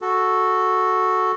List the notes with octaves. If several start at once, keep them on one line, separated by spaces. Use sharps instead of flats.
F#4 A4